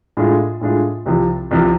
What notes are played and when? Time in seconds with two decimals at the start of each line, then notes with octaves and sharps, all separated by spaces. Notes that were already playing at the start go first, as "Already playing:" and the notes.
0.17 A2 G#3 D4 F4
0.61 A2 G#3 D4 F4
1.06 C2 C3 F3
1.51 C2 C3 F3